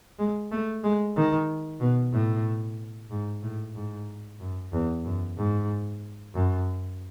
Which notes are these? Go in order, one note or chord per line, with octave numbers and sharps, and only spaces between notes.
G#3
A3
G#3
D#3
B2
A2
G#2
A2
G#2
F#2
E2
F#2
G#2
F#2